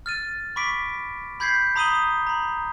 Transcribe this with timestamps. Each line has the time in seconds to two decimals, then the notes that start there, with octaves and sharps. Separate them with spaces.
0.06 F6 A6 D#7
0.56 B5 C#6 D6 B6 D7
1.40 B5 G6 G#6 B6 C7
1.76 A#5 B5 D#6 B6 D#7 G7
2.27 A#5 B5